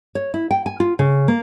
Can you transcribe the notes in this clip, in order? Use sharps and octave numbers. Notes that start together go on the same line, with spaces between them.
C#5
E4
G5
G#5
F4
C#3
A#3